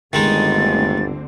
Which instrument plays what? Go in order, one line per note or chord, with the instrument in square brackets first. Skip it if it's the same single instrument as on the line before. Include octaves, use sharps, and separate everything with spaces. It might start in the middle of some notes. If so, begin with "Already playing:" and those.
[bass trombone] G1 [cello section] D2 D3 C4 [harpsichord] D#3 G#3 D#4 [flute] A6